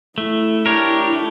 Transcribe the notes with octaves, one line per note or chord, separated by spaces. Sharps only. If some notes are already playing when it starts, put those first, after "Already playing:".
A3 E4
D4 G4 A#4 C#5
A3